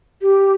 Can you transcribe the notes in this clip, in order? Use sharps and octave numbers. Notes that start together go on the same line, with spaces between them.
G4